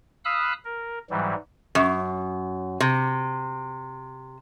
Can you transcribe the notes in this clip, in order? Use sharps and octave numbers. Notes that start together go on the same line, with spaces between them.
F5 B5 D#6 E6 F#6
A#4
G#2 E3 F#3 G3
F#2
C3